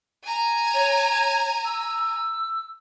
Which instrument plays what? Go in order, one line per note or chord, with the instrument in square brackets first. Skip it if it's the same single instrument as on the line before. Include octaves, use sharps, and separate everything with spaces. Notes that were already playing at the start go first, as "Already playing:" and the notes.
[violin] G#5 A#5
[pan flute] C#5
E6